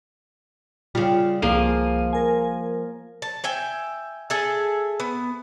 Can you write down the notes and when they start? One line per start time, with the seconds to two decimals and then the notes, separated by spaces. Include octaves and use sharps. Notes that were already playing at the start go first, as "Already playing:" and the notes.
0.95 C#3 G3 F4
1.42 C2 F3 A#3 G#4 D#7
2.13 A#4 G#5
3.22 A5
3.44 E5 G5 G#5
4.30 G#4 A4 E5 A5
5.00 B3